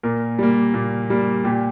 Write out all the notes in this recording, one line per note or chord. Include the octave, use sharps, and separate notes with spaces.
A#2 A#4
G3 A#3
A#2
G3 A#3
A#2 G4